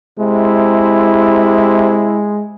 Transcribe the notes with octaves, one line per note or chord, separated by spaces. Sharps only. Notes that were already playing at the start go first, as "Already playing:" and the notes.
C3 G#3 E4